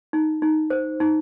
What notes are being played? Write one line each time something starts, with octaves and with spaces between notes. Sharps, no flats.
D#4
D#4
C5
D#4